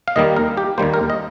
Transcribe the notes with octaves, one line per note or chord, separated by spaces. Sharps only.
F5
D#2 D#3 G3 A#3 D#5
A#4
G4
D#2 D#3 G3 A#3 C5
A#4
D#5